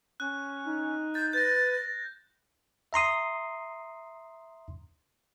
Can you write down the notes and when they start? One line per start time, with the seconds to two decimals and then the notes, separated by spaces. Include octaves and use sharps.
0.20 C#4 F#6
0.66 D#4
1.15 G6 A6
1.33 B4 G6 A6 A#6
2.93 E5 A#5 C6 D#6